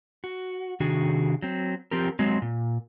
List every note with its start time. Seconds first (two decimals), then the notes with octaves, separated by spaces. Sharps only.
0.24 F#4
0.80 C3 D#3 D4 F#4 G#4
1.42 F#3 C4
1.91 F3 C4 G4 A#4
2.19 F#3 G#3 C4
2.42 A#2